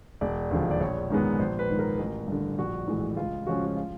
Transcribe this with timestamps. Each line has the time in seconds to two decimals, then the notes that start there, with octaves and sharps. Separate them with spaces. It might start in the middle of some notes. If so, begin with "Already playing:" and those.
0.21 E1 D5
0.51 D#2 D3 F3
0.71 D5
0.80 A#1 C#5
1.10 G#2 D#3 G#3 B3
1.39 A#1 C5
1.59 B4
1.70 G#2 D#3
1.79 A#4
1.99 A1 A#4
2.28 G2 D3
2.58 A#1 F#4
2.88 A2 E3 G#3
3.17 C#2 F4
3.47 C#3 F3 G#3 C#4 F#4
3.65 F#4
3.77 F4